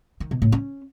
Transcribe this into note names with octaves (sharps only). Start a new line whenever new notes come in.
D#3
B2
A2
C#4